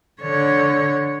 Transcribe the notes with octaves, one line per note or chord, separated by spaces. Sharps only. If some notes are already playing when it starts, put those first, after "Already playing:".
D3 C#5